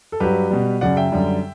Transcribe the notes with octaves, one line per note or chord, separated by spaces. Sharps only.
A4
G2 F#3 G4 B4
B2 G3
F#2 C#3 F#3 D5 F#5
E5 G5
F#2 D3 G3